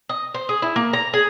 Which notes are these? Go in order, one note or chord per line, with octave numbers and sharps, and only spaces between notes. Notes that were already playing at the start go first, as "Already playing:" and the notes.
D#5
C5
G#4
E4
A#3
A#5
G#4